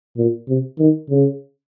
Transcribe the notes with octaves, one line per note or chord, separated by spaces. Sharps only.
A#2
C3
D#3
C#3